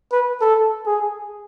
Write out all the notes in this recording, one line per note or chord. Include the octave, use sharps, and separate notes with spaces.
B4
A4
G#4